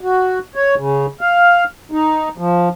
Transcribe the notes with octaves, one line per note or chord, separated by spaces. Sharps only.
F#4
C#5
C#3
F5
D#4
F3